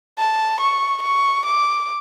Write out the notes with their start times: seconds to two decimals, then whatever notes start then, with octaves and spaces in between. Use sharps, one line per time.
0.18 A5
0.61 C#6
1.03 C#6
1.46 D6